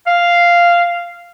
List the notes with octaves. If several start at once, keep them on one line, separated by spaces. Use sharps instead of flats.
F5